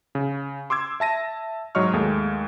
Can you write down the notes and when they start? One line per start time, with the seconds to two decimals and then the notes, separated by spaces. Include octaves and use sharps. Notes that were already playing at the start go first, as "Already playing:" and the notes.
0.15 C#3
0.70 C6 D6 E6 G#6
1.00 E5 A5 A#6 D#7
1.75 G#2 F#3 C#5 D#5 C#6 F6
1.93 D#2 G#3 A3